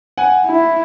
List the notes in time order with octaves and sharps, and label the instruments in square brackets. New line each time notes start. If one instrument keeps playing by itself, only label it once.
[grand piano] F#5 G#5
[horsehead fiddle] E4